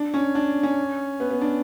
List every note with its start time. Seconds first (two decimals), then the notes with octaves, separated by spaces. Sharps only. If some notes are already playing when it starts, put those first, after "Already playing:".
Already playing: D4
0.14 C#4
0.35 D4
0.63 C#4
1.20 B3
1.31 B3
1.41 D4